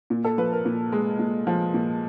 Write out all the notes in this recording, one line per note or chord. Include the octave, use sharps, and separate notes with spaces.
A#2
A4
F3 B4
A#4
A#2
G#3
A#2
F3
A#2